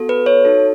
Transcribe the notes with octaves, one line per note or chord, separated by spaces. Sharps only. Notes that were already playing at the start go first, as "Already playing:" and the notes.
Already playing: B3 F#4 A4
B4
C#5
D#4 F#4 A4